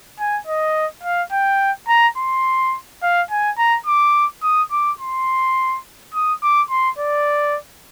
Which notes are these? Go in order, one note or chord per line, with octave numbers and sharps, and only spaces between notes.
G#5
D#5
F5
G5
A#5
C6
F5
G#5
A#5
D6
D#6
D6
C6
D#6
D6
C6
D5